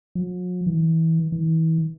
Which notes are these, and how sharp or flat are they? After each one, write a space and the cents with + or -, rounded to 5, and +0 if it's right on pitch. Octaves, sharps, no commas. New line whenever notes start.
F#3 -45
E3 -25
E3 -35